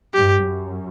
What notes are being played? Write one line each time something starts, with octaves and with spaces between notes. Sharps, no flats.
G2 G4
F#2